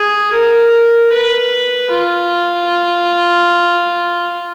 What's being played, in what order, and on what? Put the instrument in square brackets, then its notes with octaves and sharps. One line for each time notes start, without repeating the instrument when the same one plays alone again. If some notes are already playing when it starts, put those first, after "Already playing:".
Already playing: [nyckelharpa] G#4
A#4
B4
F4